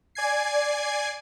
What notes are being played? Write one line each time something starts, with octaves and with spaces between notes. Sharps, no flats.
D5 G#5 G#6 C7